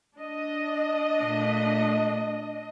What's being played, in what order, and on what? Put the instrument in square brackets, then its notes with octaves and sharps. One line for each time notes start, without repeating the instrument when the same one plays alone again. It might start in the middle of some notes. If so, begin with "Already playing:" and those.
[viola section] D4 D#5
[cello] A#2 A3